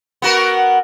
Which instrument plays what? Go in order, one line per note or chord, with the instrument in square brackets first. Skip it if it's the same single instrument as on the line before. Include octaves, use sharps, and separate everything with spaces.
[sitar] B3 F#4 A#4